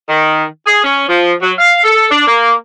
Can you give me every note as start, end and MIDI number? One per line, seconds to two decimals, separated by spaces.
0.09 0.43 51
0.66 0.81 68
0.84 1.04 61
1.09 1.33 53
1.42 1.52 54
1.58 1.80 77
1.84 2.08 69
2.10 2.25 62
2.27 2.53 58